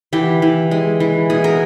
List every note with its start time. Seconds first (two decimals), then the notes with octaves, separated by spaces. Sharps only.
0.13 E3 G4
0.42 E3
0.71 G#3
1.00 E3
1.30 B2 G#4
1.44 A#4